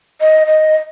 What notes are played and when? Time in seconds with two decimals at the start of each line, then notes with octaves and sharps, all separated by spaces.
0.21 D#5
0.46 D#5